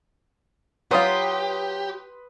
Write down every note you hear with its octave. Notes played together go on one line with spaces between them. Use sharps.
F#3 F4 G4 B4 C6 D#6